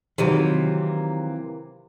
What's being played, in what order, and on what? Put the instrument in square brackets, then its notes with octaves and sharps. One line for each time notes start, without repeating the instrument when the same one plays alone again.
[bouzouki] C3 E3 A#3 [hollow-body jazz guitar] D#3 F#3